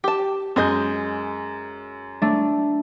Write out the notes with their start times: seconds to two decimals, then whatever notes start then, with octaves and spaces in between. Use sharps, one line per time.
0.04 G4 A5
0.56 F#2 G#3 G#4 D#5 G6
2.22 A3 D4